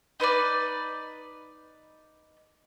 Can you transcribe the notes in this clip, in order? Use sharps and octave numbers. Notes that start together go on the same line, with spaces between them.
D#4 B4 C5 D5